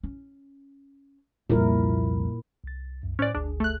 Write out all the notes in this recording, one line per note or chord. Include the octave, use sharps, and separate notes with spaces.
C#4
C2 F2 A#2 E4 A#4
C2 A6
C2 F#2
A2 C#4 C5 D5 F#6
G1 D2 D4 G#4
A3 F#6